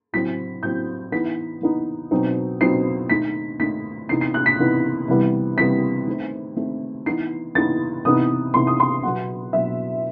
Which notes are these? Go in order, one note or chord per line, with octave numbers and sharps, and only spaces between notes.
A2 F#3 C4 B6
A2 F#3 C4 G6
E3 B3 D#4 B6
E3 B3 D#4
B2 F#3 C4 D#4
B2 F#3 C4 D#4 C7
D#3 A3 D#4 B6
D#3 A3 D#4 B6
C3 E3 B3 D#4 C7
C7
F#6
B6
C3 E3 B3 D#4
C3 E3 G3 B3
C3 E3 G3 B3 B6
D#3 A3 C4
D#3 A3 C4
E3 B3 D#4 C7
E3 B3 D#4 A6
C3 E3 B3 D#4 D#6
C3 E3 B3 D#4 C6
D#6
C6
B2 F#3 B3 F#5
B2 F#3 B3 E5